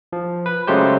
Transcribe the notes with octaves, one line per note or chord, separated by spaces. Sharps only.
F3
B4
C#3 F#3 G#3 A3 G4 C5